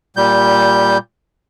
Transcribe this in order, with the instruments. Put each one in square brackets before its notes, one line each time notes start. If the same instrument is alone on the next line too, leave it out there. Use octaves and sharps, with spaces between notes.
[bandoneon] A#2 G3 G6